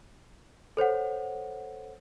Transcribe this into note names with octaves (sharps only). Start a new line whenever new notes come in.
A4 C5 C#5 F#5